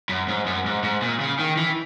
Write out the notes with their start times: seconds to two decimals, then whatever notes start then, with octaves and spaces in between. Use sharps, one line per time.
0.09 F#2
0.28 G#2
0.46 F#2
0.66 G#2
0.83 G#2
1.02 A#2
1.20 C#3
1.39 D#3
1.57 E3